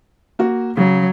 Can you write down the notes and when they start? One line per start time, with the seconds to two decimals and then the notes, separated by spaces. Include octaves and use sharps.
0.39 A#3 F#4
0.77 C#3 F#3